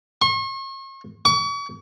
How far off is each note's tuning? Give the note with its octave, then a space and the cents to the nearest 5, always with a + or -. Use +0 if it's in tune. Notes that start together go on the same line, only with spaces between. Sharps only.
C#6 -45
C#6 +40